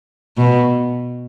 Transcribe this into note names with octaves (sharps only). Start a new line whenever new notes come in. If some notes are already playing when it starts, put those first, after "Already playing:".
B2